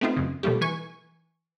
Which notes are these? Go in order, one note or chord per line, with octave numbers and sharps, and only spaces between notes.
A3 B3 C4 D#4 F4
F#2 C#3
B2 F3 G3 A3 A#3 G4
E3 G#5 C#6